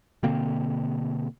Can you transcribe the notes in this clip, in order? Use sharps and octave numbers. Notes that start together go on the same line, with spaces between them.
B2 D3 A#3 C4